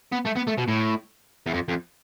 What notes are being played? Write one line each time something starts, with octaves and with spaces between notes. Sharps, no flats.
B3
A3
B3
A3
B2
A2
E2
F2
F2